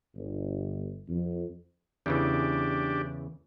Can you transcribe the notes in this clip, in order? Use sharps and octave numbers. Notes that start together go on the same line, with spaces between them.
G1
F2
E2 C#3 E3 D4 G4